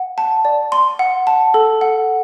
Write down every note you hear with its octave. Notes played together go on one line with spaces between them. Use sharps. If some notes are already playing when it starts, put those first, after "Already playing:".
Already playing: F#5
A5
D5
C6
F#5
A5
A4
F#5